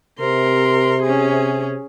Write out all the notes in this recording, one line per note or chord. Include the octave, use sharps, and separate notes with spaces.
C3 A#4 C6
C#4 G#4